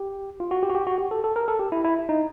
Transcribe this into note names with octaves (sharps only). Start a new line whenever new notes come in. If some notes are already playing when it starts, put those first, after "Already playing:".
Already playing: G4
F4
F#4
G4
F#4
G4
F#4
G4
A4
A4
A#4
A4
G4
E4
E4
D#4